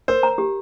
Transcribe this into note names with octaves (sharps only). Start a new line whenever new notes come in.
A#4 C5
A#5
G4